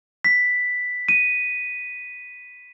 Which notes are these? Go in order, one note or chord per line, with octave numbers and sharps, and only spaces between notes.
B6
D#7